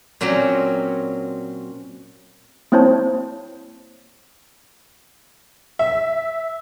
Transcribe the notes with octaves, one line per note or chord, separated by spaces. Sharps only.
A#2 F#3 C4 C#4 A#4
A#3 C4 E4 C5 C#5 A5
E5